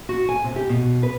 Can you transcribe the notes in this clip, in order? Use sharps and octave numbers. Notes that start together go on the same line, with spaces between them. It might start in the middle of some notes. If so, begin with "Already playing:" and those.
F#4
G#5
C3
G4
B2
B4